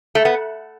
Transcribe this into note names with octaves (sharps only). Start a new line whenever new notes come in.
A3
B3